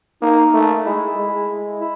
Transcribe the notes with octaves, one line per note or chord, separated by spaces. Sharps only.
A#3 D#4
A3
G#3 E4
G#3
E4